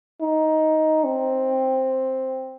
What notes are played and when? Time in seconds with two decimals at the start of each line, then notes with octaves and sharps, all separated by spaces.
0.21 D#4
1.05 C4